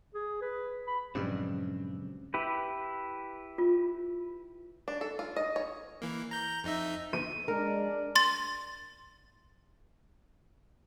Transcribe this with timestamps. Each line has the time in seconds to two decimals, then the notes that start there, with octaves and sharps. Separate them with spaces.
0.15 G#4
0.42 B4
0.88 B5
1.15 A#1 G2 C#3 F#3 G#3 C4
2.34 E4 G4 B4
3.58 F4
4.88 D4
5.01 A4
5.19 F4
5.36 D#5
5.56 C#5
6.02 E3 A#3
6.31 A#5 G6
6.64 F2 D#4 E5
7.13 D#7
7.48 G#3 D4 A#4
8.15 C6 A6